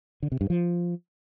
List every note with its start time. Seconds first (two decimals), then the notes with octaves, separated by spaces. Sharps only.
0.23 D3
0.32 C3
0.41 G2
0.50 F3